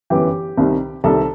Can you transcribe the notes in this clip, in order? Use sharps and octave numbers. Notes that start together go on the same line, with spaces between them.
G1 F#2 E3 B3 G4 G5
C2 C3 D#3 G3
C2 C3 D#3 G3 A4 A5